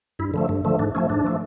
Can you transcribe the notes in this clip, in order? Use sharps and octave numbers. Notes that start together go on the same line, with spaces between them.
G2 E4
D3 F3 A3
G2
D3 F3 A3
G#2 D4
F3 A3 C#4
G#2 D4
F3 A3